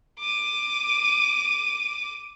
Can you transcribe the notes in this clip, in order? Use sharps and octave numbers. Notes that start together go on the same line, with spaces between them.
D6 D#7